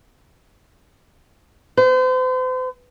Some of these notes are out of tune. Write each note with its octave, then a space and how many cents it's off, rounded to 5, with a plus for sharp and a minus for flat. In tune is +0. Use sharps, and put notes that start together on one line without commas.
C5 -40